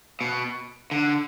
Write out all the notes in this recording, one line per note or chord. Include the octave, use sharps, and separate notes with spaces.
B2
D3